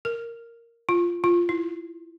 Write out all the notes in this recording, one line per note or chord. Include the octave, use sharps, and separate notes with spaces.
A#4
F4
F4
E4